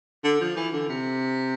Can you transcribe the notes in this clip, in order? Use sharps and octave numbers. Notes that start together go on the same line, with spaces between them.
D3
F3
E3
D3
C3